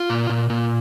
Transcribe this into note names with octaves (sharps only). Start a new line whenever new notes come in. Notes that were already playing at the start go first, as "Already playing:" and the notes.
Already playing: F4
A#2
A#2
A#2